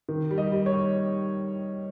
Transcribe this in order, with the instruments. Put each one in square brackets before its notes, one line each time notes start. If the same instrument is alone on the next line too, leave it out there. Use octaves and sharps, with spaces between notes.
[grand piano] D#3
G3
D#5
G3
C#5
G3